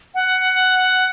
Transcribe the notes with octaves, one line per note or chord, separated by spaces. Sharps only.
F#5